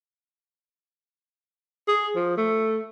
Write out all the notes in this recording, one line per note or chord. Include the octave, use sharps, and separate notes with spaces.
G#4
F3
A3